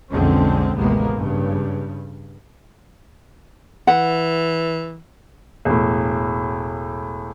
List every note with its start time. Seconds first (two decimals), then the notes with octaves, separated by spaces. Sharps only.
0.11 B1 F2 D3 G#3 C4 C#4
0.77 A1 D#2 C3 G#3 A#3 B3
1.16 G2 C#3
3.87 E3 F#5
5.65 E1 A2